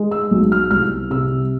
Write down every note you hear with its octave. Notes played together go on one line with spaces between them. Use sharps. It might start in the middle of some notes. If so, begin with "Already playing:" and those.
Already playing: G#3
E6
B1
F6
C2 F6
C3 E6